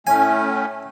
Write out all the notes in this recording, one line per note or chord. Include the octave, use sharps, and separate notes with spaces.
A2 A3 C#4 G#5